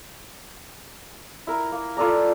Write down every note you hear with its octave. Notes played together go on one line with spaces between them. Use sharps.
E4 A#4
A#3
F4 A4 D5 A#5